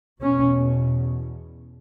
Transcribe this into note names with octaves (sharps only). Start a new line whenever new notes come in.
E2 B2 C#4